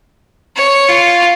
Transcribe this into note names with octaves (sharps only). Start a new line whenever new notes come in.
C#5
F4